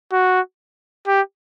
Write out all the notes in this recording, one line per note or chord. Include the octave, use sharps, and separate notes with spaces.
F#4
G4